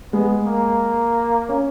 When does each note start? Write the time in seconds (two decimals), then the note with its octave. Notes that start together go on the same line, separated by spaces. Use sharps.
0.13 G#3 B3
0.47 A#3
1.49 C#4